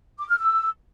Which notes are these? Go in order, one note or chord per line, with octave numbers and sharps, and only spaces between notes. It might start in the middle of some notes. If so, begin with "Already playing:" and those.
D6
F6
E6